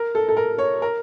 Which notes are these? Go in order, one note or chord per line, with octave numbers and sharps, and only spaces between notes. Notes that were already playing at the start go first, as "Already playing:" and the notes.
Already playing: A#4
A4
A4
A#4
C#5
A#4